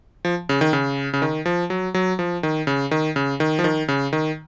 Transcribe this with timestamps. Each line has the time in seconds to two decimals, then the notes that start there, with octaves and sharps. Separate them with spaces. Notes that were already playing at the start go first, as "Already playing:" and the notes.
0.25 F3
0.49 C#3
0.61 D#3
0.73 C#3
1.14 C#3
1.22 D#3
1.46 F3
1.70 F#3
1.94 F#3
2.19 F3
2.43 D#3
2.67 C#3
2.91 D#3
3.16 C#3
3.40 D#3
3.59 F3
3.64 D#3
3.88 C#3
4.13 D#3